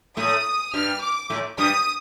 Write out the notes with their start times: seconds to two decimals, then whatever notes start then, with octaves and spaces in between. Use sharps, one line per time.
0.17 A2 A3 D#6
0.73 G2 G3 F6
1.02 D6
1.30 A2 A3
1.58 G2 G3 D#6